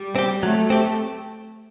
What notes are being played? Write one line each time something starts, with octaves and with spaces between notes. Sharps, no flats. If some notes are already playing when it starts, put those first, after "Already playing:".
Already playing: G3
C4 G4
F#3 A3
C4 G4